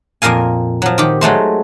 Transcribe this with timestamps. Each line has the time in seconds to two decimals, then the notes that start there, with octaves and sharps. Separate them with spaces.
0.22 F2 A#2 A#4 F5 G#5
0.82 F3 F#3
0.98 D#3 G4
1.21 F#3 G#3 A3 C5